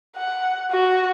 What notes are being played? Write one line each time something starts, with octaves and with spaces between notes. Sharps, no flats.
F#5
F#4